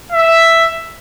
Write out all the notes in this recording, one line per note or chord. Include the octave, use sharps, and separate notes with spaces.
E5